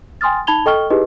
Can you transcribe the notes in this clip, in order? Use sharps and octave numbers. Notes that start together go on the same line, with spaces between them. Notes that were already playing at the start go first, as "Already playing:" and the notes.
G5 G#5 C6 D#6 F6 A6
D#4 A5 B5 G#6 F7 G7
A4 D#5 G5 C#6 F6 G7
D#4 E4 G4 G#4 B4 D#5